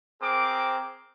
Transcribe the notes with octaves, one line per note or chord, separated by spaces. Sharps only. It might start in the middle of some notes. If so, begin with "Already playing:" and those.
C4 G#4 A#4 D6